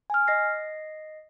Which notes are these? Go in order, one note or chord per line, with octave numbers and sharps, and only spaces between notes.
G#5 F6
D#5 A#6 C7